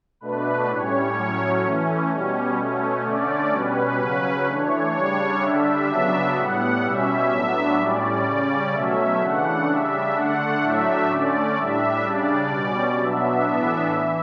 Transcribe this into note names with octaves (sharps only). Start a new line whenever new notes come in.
B2 A3 D4 B4
A2 G3 C#4 C#5
A2 F#3 C#4
E3 A3 C#4
B2 G3 C#4
B2 A3 C#4
D3 A3 C#4 D5
B2 G3 C#4 B4
C#3 F#3 C#4
E3 A3 D4 C#5
C#3 G3 D4 C#5
D3 G3 D4 E5
C#3 F#3 B3 D4
A2 G3 B3 F#5
B2 G3 C#4 E5
A2 F#3 B3 D4
A2 G3 C#4 D5
C#3 G3 C#4 D5
B2 F#3 A3 C#4 E5
C#3 E3 A3 D4 F#5
C#3 G3 D4 E5
D3 A3 D4 F#5
A2 F#3 A3 D4 E5
D3 A3 C#4 D5
A2 G3 D4 E5
C#3 G3 D4 D5
B2 G3 C#4
B2 F#3 B3 D4 E5
A2 E3 B3 D4
E3